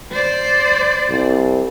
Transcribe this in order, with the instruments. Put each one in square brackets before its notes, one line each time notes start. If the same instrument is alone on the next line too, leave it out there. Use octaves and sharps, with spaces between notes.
[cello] C5 D5
[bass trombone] C2